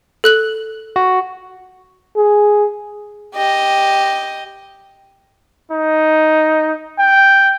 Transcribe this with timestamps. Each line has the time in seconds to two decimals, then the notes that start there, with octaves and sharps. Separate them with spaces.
0.24 A4 F#6 F#7
0.96 F#4
2.16 G#4
3.35 G4 D#5
5.72 D#4
6.99 G5